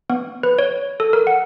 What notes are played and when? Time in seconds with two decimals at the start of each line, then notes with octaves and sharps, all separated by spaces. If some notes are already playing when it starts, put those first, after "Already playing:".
0.10 B3
0.43 B4
0.59 C#5
1.00 A4
1.13 A#4
1.27 F#5